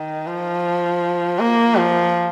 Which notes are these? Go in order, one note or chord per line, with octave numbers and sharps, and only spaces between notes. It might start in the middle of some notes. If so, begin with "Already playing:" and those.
Already playing: D#3
F3
A#3
F3